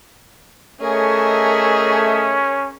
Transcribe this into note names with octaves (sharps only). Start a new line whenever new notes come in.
A3 C#4 G#4 A#4 C#5 D#5 E5